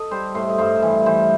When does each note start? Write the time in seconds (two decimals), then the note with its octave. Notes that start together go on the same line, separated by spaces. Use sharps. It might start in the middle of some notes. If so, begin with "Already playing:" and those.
Already playing: A4 D#5
0.11 G3 C5
0.35 A2 C5
0.49 D#5
0.58 G2 C5
0.82 E3
1.06 E3 C5